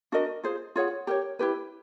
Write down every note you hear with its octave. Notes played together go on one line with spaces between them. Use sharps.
D4 F#4 A#4 D#5
F4 G#4 C5
F4 G#4 C#5 F#5
G4 A#4 C#5
E4 G4 B4